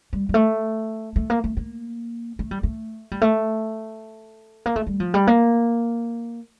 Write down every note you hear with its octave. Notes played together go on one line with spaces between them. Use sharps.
G3
G3
A3
A3
A#3
A3
A#3
A3
G3
A3
G3
A3
A#3
A3
G3
F3
G3
A#3